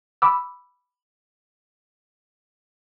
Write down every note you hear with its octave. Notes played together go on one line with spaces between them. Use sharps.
B5 D6 E6